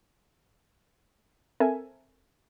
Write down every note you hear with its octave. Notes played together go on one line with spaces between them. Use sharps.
C4 A4 A#4 E5 G#5